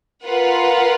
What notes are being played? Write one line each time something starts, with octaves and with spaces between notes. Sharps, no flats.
F4 A#4 B4 F#5